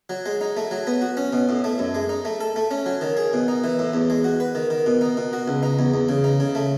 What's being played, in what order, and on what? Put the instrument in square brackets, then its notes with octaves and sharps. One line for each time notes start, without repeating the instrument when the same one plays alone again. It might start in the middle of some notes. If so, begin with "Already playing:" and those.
[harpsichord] F#3
G#3
D#4
A3
F#3
B3
F#4
C#4
B2
A2
A3
F#2
G#3
D#4
A3
A4
A3
C#4
F#3
D#3
G#4
B2
D#4
E3
A2
E2
G#3
F#4
B4
D#3
D#3
B2
D#4
B2
F#4
C#2
D#4
E2
E2
C#3
D#4
C#3
A3